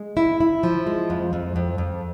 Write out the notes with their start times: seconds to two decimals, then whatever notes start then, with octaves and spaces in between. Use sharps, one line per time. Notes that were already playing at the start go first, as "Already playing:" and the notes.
Already playing: G#3
0.17 E4
0.40 E4
0.63 F3
0.87 G#3
1.10 F2
1.33 F2
1.56 F2
1.78 F2